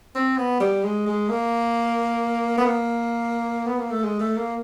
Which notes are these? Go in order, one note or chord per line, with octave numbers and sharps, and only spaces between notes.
C4
B3
G3
G#3
G#3
A#3
B3
A#3
B3
A#3
A3
G#3
A3
A#3